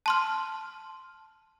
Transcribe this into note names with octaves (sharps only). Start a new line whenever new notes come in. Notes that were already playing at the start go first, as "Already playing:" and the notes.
A5 C6 F6